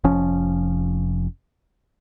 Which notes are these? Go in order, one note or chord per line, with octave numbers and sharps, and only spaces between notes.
F1 F3 C#4